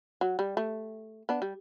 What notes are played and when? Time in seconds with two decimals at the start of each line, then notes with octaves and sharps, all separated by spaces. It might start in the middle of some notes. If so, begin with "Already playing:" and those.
0.21 F#3
0.39 G3
0.57 A3
1.29 B3 D4
1.42 G3